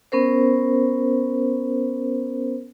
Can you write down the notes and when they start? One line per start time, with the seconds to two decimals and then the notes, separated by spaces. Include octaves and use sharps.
0.12 B3 C#4 A#4 C5